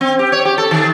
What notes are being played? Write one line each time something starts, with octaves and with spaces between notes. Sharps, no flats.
C4
G4
C#5
G4
A4
D#3